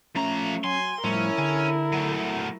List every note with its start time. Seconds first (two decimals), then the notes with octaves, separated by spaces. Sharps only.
0.16 F3 A3 C#4 A#5
0.64 F#3 G#5 C6
1.04 A2 F3 G3 C#4 E4 A#4 E5
1.38 D3 G#4 G#5 A5
1.93 F#3 A3